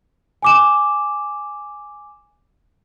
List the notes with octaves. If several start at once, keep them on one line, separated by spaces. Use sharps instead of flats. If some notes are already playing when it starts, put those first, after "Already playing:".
G#5 D6 E7